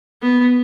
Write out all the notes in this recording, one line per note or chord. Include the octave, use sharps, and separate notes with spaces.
B3